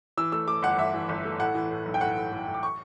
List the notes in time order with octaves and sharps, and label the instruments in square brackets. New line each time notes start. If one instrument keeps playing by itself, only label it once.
[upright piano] E3 E6
A3 E6
A3 D6
G1 F#5
G1 E5
E3
G1
A3
A2 F#5
E3
A2
B1
G5
A2 F#5
A2
A2
A2
D6
C#6